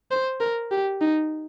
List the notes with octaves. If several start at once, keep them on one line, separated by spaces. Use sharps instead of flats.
C5
A#4
G4
D#4